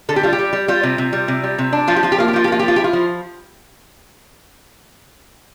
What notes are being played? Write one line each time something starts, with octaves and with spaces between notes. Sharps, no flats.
D3 A4
G4
G3 F4
G4
G3
G3
G3 F4
C3
C3
G3
C3
G3
C3
D4
F3 F4
G4
F3 F4
G4
A#3 F4
G4
F3 F4
G4
A#3 F4
G4
F3
F4
E4 G4
F4
F3